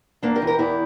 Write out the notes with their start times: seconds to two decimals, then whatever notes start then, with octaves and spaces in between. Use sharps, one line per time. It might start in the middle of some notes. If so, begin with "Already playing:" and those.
0.22 E2 A#3 D4
0.35 G4 A#4
0.42 E3
0.47 G4 A#4
0.59 E2 E4 G4